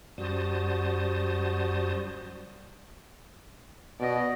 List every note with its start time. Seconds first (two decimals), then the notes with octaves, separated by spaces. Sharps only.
0.18 F#2 G3 F#4 C5 A5 D#6
4.00 B2 D5 D#5